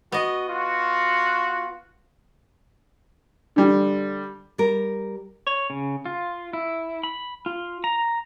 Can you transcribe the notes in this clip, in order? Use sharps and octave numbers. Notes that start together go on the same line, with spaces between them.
B3 F#4 D#5
F4 F#4
D3 G3
G3 A#4
C#5
C#3
F4
E4
B5
F4
A#5